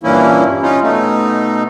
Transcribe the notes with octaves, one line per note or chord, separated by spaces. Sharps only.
G2 A#2 E3 A#3 C#4 E4
C#4 D#4 F4
B2 A3 D#4